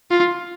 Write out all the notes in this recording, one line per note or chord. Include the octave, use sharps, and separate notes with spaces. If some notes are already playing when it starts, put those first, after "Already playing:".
F4